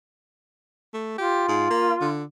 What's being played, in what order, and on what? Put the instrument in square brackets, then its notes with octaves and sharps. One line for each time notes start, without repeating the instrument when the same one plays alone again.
[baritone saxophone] A3
[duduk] F4 [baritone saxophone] G4
[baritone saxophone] G#2
A#3
D3